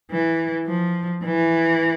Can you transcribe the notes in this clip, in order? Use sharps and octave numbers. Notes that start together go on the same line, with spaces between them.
E3
F3
E3